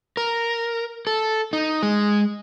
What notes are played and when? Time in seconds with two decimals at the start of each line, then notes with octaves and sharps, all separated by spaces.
0.17 A#4
1.07 A4
1.53 D#4
1.82 G#3